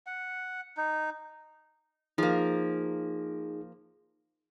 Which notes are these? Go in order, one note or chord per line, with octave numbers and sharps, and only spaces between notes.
F#5
D#4
F3 A#3 D#4 G#4